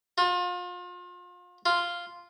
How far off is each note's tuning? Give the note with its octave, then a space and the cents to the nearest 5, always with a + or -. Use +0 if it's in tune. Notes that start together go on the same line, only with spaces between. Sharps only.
F4 +35
F4 -5